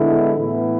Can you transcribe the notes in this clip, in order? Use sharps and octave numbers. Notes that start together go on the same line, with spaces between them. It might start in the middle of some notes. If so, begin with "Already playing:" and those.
Already playing: D3 G#3 B3 E4 A4
A2 E3 B3 E4 B4